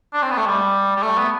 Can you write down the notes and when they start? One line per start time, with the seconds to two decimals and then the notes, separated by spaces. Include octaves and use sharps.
0.13 D4
0.22 C4
0.31 B3
0.38 A3
0.47 G3
0.96 G3
1.03 A3
1.18 B3